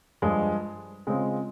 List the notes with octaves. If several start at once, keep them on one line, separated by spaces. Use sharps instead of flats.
G2 F3 G#3
C#3 G#3 C4 F4